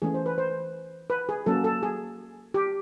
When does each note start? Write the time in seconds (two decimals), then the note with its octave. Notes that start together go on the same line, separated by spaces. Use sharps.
0.02 E3 A3 C#4 G#4
0.14 C5
0.26 B4
0.38 C5
1.10 B4
1.29 G#4
1.46 F#3 A#3 C#4 A4
1.64 A4
1.83 G#4
2.54 G4